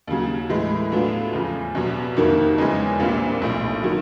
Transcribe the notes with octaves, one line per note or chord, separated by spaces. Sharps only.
D#2 C#3 F#3
A2 E3 G#3
A2 F#3 B3 D4 F4
E2 C#3 F3
C2 B2 F#3
F2 C3 D#3 F#3 A#3
E2 C#3 E3 G#3 C#4
A#1 A#2 G3 C4 F4
B1 A2 F3
D#3 F#3